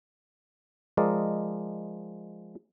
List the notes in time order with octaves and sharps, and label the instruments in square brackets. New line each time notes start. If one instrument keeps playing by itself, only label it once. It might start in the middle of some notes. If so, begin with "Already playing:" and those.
[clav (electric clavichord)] F3 G#3 A#4 D5 D#5